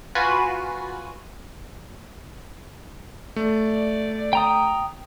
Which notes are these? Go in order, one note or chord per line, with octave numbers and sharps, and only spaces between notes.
F4 F#4 B4 G#5
A3 D5
G5 A#5 D#6